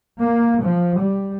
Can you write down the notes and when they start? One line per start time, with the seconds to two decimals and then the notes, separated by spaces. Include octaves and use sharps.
0.20 A#3
0.63 F3
0.98 G3